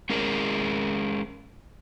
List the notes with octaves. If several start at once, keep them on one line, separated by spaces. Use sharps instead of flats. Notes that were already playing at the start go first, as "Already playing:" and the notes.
G#3 C#4 G#4 A#4